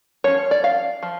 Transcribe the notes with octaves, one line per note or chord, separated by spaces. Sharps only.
F3 C#4 C#5
D5
F5
F3